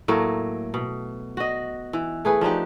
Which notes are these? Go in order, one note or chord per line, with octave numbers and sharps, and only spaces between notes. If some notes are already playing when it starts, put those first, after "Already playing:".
A2 F#3 A3 A#3
B2
F#4 D#5
E3
A3 G#4 B4
F3 D4 D#4 G4